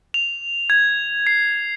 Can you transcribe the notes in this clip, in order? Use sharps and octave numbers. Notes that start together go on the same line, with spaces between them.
F7
G#6
C7